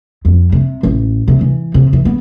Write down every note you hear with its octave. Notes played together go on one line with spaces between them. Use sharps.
F2
C3
A1
C3
E3
C3
E3
B3